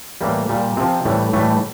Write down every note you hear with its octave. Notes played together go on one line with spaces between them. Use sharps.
A2 E3 G3 A#3
A#2 G3
C3 F3 C4
A2 E3 G3
A2 E3 G3 A3